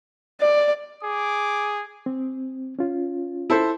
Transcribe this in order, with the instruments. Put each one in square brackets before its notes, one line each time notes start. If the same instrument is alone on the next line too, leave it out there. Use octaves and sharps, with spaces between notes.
[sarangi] D5
[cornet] G#4 [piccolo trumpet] D6
[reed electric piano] C4
C#4 F4
[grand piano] E4 A4 C5